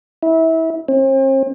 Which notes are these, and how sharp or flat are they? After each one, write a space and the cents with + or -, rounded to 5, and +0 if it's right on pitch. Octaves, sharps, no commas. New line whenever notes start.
E4 -25
C4 +45